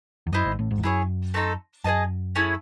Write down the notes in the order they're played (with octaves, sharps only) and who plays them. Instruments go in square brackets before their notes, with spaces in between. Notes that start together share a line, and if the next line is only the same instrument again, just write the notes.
[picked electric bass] E2
[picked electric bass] F#2 [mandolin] E4 C5 D#5
[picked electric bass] G#1 G#2
A1 A2
G#1 G#2
E2
[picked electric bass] F#2 [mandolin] E4 G#4 C#5
[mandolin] A3 C4 D#4 A4
[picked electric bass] F#2 [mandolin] G#4 C5 D#5 A5
[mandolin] A3 C#4 E4 G#4